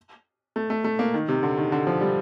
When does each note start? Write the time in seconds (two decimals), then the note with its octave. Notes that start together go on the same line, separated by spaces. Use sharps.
0.56 A3
0.70 A3
0.84 A3
0.99 A#3
1.14 D#3
1.29 C3
1.43 D3
1.57 D#3
1.72 D3
1.87 F3
2.01 G3